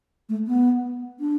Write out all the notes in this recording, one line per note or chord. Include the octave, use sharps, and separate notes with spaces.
A3
B3
D4